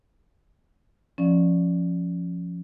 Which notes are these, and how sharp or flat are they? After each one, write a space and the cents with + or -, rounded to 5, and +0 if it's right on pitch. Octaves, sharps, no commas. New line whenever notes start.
F3 +0 C#4 +0 D5 +0